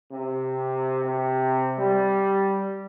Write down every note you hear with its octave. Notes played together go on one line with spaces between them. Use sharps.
C3
C3
G3